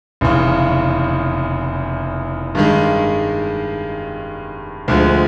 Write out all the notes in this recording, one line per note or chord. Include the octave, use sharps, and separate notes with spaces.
F1 E2 C#3
G2 D#3 G#3
D2 D3 F3 G#3